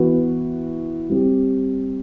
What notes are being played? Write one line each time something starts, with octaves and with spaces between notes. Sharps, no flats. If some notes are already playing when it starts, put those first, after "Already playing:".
Already playing: E3 B3 F#4 B4
G3 C4 G4